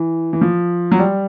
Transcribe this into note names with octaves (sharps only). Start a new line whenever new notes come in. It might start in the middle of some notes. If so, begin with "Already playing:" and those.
Already playing: E3
E3
F3
F#3
G3